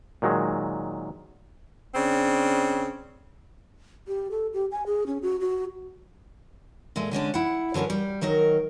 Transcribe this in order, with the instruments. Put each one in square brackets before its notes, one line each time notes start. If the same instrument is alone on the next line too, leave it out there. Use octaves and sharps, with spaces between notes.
[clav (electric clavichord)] A#2 D#3 F#3 G#3
[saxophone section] C#3 C4 D4
[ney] G4
A4
G4
G#5
G#4
C#4
F#4
F#4
[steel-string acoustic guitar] A#2 G#3 A3
D3 G#3 C#4 D4
E4 F#5
D3 F#3 C#4 A#4 B4
G3
D#3 F#3 D#4 A#4